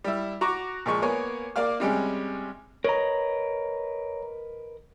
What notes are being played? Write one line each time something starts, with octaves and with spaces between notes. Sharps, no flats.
G3 E4
F#4 A#5 C#6 D6
A#2 F3 G#3 C#6
A#3 B3 C#5 G#5
A#3 D5 F5 F6
C3 G3 G#3 C#4
A#4 B4 C#5 D#5 A#5